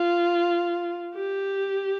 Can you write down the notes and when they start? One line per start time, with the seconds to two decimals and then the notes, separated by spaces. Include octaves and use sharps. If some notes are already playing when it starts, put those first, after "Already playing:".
Already playing: F4
1.15 G4